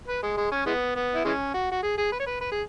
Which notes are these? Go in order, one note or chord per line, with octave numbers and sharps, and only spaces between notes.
B4
G#3
G#3
C#4
E3 G#3 B3
B3
E4
E3 G#3 C#4
F#4
F#4
G#4
G#4
B4
C#5
B4
B4
G#4